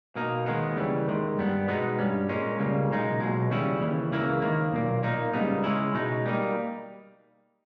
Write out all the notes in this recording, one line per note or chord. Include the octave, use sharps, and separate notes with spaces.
B2 A#3 D#4
D#2 D#3 G#3 B3
C#3 E3 G3
D#2 D#3 G#3
G2 G3 B3
B2 G#3 B3 D#4
G2 G3 C#4
A#2 G#3 C#4
C#2 C#3 G3 A#3
B1 A#2 G#3 D#4
B1 B2 G#3
D#2 C#3 G3 C#4 E4
D#2 C#3 E3
C#2 C#3 E3 A#3 E4
D#2 D#3 A#3
B1 A#2 A#3
A#2 A#3 D#4
C#2 C#3 G3 B3 D#4
C#3 G#3 C#4 E4
B2 G#3 D#4
G3 A#3 D#4